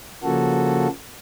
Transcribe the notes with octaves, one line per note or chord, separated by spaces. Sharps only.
C#3 F3 A#3 F#4 A4